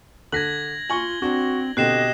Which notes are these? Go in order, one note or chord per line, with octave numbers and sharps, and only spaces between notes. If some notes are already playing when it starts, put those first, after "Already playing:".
D3 F#6 G#6 A#6 B6 F#7
F4 G#5 C#6 F#7 G7
C4 D4 F#4
B2 D3 C4 G4 D#5 F#6 C7 E7